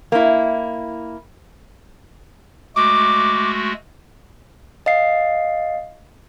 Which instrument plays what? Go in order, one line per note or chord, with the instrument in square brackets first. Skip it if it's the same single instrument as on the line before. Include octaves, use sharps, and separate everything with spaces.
[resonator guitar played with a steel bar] A#3 E4
[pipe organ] G#3 A3 F#4 [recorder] D6
[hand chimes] D#5 F5 C7